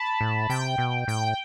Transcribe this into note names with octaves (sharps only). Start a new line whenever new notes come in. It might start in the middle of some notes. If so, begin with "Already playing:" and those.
Already playing: A5 B5
A2
C3 G5
B2
A2 G5